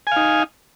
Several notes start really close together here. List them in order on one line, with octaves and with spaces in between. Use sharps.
G#5 F5 D#4